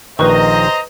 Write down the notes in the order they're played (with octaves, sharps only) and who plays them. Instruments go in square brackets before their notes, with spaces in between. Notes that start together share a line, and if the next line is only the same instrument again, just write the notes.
[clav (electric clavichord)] A#1 D#3 [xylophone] B4 C#6 [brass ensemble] C5 D#5 A#5